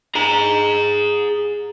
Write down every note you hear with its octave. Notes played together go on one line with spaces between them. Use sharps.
G#4 A#5